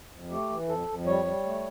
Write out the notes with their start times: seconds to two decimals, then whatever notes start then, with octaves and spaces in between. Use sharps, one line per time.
0.12 F2
0.31 A3 G4
0.50 E3
0.68 F2 A4
0.88 F2
1.06 G3 C#5
1.26 G3
1.44 A3